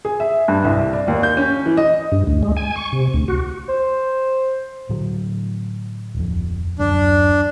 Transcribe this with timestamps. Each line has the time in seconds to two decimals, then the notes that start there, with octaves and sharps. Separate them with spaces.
0.05 G#4
0.20 E5
0.48 G2
0.65 C2
0.93 D5
1.08 D#2
1.23 G6
1.37 C#4
1.66 E3
1.77 D#5
2.12 G2
2.27 D2
2.43 G#3
2.57 G#5
2.76 C#6
2.92 C3
3.13 D2
3.28 F#4
3.69 C5
4.89 A2 D3 F#3
6.14 D1 F2
6.79 D1 F#2 D4